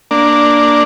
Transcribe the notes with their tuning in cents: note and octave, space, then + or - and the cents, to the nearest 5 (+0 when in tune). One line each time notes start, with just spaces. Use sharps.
A#3 +0 D4 +0